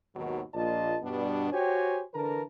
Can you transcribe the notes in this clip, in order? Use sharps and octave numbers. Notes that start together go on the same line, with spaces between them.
D#2 G#2 B2 D#3 F#3
A#1 A#3 F4 D5 D#5 A5
G2 B2 G3 B3 D4
F#4 G4 C5 C#5 G5 G#5
D3 E3 A#4 B4 A5 A#5